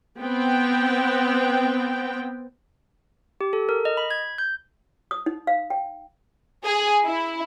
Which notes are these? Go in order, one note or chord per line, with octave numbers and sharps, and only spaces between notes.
B3 C4 G5
G4
A4
A#4
D#5
B5
G#6
G6
D#6
D#4
F5
G5
G#4
E4